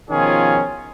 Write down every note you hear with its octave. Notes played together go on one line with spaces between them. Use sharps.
B2 D#3 F3 C#4 F4 G#4